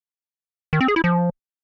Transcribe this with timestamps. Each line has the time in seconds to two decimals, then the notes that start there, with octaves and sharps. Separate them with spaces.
0.73 D#3
0.81 C4
0.88 G#4
0.96 E4
1.04 F3